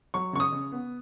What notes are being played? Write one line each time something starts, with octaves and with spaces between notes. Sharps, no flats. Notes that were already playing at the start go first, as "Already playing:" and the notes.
F#3 C#6
C#3 C#6
D#6
C#3
B3